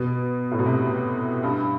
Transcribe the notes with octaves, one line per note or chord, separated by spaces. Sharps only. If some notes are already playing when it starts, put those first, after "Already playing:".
Already playing: B2
A2
B2
C3
G2